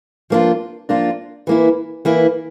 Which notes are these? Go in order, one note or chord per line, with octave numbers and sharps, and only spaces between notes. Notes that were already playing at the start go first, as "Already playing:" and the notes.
F3 A#3 D4 F4
F3 A#3 D4 F4
E3 A#3 E4
E3 A#3 E4